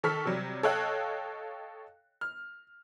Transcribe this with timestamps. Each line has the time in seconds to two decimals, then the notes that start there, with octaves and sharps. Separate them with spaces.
0.03 D#3 A4 C#6 F6 B6
0.25 C3 F#3 G3
0.63 A4 C#5 D#5 F5 G5 F#6
2.21 F6